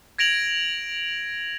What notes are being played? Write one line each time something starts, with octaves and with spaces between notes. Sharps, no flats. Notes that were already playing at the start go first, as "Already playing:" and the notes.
G#6 A#6 D7 F7 F#7